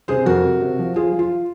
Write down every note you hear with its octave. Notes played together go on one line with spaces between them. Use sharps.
C3 G#4 C5
F2 F#4 A#4
C3
C3
F3
F3 F4 G#4
F3
F4